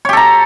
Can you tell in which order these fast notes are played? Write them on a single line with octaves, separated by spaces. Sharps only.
C#5 G4 A4 A#5